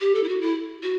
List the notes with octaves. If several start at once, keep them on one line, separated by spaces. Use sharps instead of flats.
G4
A4
E4
F#4
E4
F#4